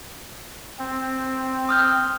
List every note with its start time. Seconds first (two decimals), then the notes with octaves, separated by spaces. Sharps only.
0.79 C4
1.69 D#6 F6 G6